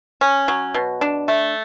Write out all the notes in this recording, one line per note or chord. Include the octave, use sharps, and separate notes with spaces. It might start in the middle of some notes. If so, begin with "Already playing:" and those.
C#4
F#3
B2
D4
A3